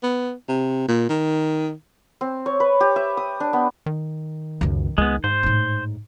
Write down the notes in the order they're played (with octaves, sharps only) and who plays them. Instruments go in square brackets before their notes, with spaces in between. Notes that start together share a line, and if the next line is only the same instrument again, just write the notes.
[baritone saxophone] B3
C3
A#2
D#3
[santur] C4
C#5
B4
G4
E5
D#6
D4
B3
[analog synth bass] D#3
[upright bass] C#2 F#2
[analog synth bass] C#2 [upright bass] D#3 [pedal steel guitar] G#3 B3
[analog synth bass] G#2 [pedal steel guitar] C5
[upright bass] A2 D#4